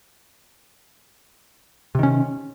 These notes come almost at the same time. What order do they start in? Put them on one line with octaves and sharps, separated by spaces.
C3 D#3 C#4